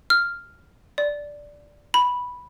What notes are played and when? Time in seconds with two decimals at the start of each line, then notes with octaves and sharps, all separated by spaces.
0.10 F6
0.98 D5
1.94 B5